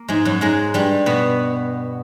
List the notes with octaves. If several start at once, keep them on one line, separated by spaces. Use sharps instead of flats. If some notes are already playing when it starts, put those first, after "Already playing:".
Already playing: A#3
G#2 G#3
F#2 F#3
G#2 G#3
G2 G3
B2 B3